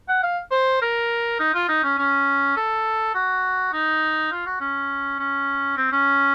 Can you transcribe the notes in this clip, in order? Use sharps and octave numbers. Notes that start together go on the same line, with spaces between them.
F#5
F5
C5
A#4
D#4
F4
D#4
C#4
C#4
A4
F#4
D#4
F4
F#4
C#4
C#4
C4
C#4